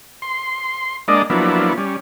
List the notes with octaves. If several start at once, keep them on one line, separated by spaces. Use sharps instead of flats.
C6
G#3 A#3 D4 D5 D#5
F3 F#3 A#3 B3 D4 E4
G3 C#4